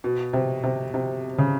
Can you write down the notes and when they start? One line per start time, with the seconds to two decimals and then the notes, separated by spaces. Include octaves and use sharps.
0.04 B2
0.33 C3
0.64 C3
0.94 C3
1.38 C#3